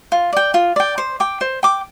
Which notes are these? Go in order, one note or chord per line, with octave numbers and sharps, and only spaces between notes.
F4
D5 G5
F4
D5 G5
C5
G5 D6
C5
G5 D6